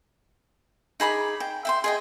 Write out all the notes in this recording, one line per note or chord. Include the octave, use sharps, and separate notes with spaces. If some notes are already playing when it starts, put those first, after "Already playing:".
D#4 G#4 B5 D6
G5
E5 G5 C6
G#4 D#5 G5